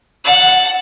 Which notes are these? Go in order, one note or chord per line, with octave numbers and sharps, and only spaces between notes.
F#5 A5